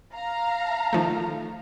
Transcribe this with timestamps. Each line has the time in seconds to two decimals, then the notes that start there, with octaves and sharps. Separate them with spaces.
0.16 F5 A#5
0.93 D#3 F3 A3